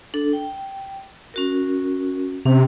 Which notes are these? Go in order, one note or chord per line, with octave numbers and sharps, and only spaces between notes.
D4 A4
G5
C#4 F#4 A#4
C3 C#4